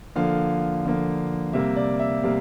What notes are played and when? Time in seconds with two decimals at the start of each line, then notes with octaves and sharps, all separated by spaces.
0.16 D3 F3 A#3 F5
0.85 D3 F3 A#3
1.53 C3 G3 A#3 E5
1.76 D5
2.00 E5
2.23 C3 G3 A#3 F5